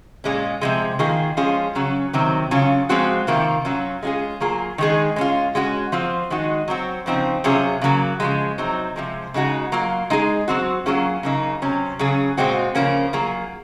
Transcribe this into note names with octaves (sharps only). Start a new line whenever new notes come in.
A#2 G#3 C#4
C3 F3 G#3
D#3 A#3 F4 G#4
F3 G#3 C#4 F4 G#4
C#3 F#3 C#4
C3 D#3 F#3 C4
C#3 F#3 C#4 F4
F3 G#3 C4 F#4
C3 D#3 A#3 F4
F#3 C#4 F4
G#3 C#4 F4 G#4
F#3 A#3 F4 G#4
D#3 G#3 D#4 G#4
G#3 C#4 F4
G#3 C#4 F#4
F3 C4 F4
D#3 G#3 D#4 F#4
F#3 C4 F#4
C#3 F3 C4 D#4
C3 F#3 C#4 F4 G#4
C#3 F#3 A#3
C#3 F3 G#3
C3 F#3 C4 D#4
C3 F3 G#3
C#3 G#3 D#4 F#4
F#3 A#3 F4
G#3 D#4 G#4
F#3 C4 F#4
F#3 A#3 C#4 F4 G#4
C#3 F#3 A#3 D#4
C3 F#3 C#4
C#3 F#3 C#4 G#4
A#2 G#3 C4 F#4
C#3 F3 A#3 C#4
F#3 A#3 F4 G#4